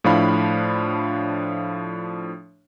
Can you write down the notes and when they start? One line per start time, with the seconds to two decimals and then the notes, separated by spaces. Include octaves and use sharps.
0.04 A2 F3 D4 F5 B5